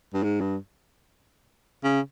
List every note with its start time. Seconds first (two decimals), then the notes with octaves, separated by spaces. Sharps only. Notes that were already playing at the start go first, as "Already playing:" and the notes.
0.13 G2
0.23 G#2
0.41 G2
1.84 C#3